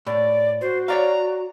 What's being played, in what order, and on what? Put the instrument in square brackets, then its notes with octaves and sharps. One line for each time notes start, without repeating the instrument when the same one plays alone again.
[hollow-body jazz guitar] A2 [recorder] D5
[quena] F#4 [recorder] C5
[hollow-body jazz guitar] C#5 D5 F5 [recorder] A#5